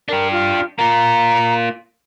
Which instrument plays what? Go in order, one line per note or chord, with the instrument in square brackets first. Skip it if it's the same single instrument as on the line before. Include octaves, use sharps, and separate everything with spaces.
[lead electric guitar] D4 G4 [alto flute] A#4
[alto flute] F4
[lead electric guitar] A#3 F4 [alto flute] A#5